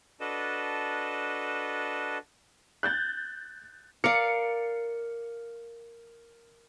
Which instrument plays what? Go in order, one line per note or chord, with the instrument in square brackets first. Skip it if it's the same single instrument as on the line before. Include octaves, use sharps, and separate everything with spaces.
[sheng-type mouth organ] D4 F#4 A4 B4 D#5 A5
[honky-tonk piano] F#6 G6 A6
[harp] A#4 [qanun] D5 F5 [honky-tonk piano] C#7